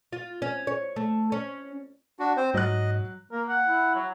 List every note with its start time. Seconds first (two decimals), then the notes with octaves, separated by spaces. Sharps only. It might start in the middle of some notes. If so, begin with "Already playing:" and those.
0.13 F4
0.42 C#4
0.67 C#5
0.96 A3
1.32 C#4
2.19 D4 F#4
2.37 C4 C5
2.54 G#2 F#3 D#5 F#6
3.32 A#3 A#4
3.48 F#5
3.66 E4
3.95 F#3